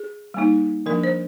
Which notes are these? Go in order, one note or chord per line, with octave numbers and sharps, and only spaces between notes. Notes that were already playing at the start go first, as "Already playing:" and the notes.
Already playing: G#4
G3 A#3 D#4
F3 A#3 D4 A#4
C5